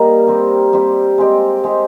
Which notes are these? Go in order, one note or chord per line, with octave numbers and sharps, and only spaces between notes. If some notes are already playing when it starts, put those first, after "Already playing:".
Already playing: G3 A#3 D#4 A#4
G3 C4 G4
G3 C4 G4
G#3 C4 G4
G#3 C4 G4